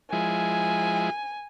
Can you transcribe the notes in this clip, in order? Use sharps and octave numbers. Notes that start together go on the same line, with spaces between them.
F3 G#3 E4 G#5